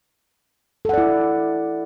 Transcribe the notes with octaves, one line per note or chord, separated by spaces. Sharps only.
E4 A4 D5 F#5